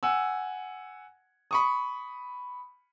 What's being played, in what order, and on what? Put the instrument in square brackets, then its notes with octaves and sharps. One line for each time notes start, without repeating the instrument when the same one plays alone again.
[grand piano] F#5 G#5 E6
B5 C#6 D#6